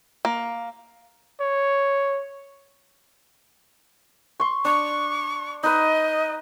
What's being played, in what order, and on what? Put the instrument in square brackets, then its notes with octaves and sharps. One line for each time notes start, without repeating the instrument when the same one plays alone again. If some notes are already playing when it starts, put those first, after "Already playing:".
[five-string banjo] A#3
[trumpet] C#5
[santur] C6 C#6
[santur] D4 [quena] C#6
[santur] D#4 B4 [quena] D#5